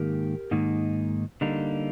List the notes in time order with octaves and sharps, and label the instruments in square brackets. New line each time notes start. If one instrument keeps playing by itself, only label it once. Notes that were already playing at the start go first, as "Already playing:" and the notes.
Already playing: [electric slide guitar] G#2 D#3 A#3 D#4 G4 A#4
G#2 D#3 A#3 D#4
D3 G3 A#3 D#4